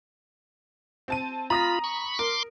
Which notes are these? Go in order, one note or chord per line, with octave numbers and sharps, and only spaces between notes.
C4 A5 D#7
F4 A#5 B5 D#6 A#6
B5 C#6
A#4 C6 D6